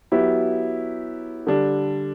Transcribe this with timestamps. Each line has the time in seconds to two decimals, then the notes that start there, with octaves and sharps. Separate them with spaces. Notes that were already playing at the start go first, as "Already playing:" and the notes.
0.12 F#3 B3 E4 G4
1.47 D3 G3 D4